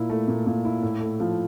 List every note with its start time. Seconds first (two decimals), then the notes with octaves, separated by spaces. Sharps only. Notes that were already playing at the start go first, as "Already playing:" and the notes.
Already playing: A#2 E4
0.10 A3
0.28 A#2
0.46 A#2
0.65 E4
0.82 A2
1.00 A3
1.20 F3